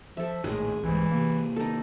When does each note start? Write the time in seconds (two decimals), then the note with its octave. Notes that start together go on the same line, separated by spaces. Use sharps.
0.17 F3 A4 E5
0.44 A#1 A2 D#3 G#3 G#4
0.83 C2 G#2 E3
1.11 C3 A#3
1.56 D#3 D#4 A4